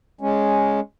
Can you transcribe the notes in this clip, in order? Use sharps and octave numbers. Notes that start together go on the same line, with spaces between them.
G#3 C#4